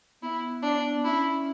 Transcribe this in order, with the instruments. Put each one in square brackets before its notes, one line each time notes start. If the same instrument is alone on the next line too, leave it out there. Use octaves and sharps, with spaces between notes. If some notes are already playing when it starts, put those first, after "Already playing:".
[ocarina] B3 [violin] E4
[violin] D4
[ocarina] C#4 [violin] E4